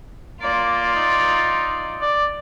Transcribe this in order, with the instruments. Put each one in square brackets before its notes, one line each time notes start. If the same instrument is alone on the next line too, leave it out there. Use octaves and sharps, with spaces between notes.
[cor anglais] A#3 [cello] F4 D5
[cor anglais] D#4
D5